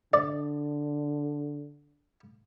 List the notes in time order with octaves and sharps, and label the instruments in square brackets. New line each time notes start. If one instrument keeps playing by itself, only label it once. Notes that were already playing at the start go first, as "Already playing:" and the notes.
[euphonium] D3 [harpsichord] D5